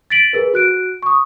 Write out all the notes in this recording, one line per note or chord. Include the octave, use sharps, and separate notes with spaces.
A6 B6 D7 F#7
G#4 A#4 B4
F#4 F#6 D7
C#6 D#6